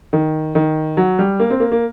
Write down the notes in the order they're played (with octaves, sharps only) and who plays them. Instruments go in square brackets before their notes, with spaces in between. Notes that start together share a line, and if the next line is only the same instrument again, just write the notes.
[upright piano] D#3
D#3
F#3
G3
A#3
C4
A#3
A#3